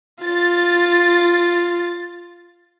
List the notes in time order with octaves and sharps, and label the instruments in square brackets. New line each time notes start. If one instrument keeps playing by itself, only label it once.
[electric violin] F4 [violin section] A6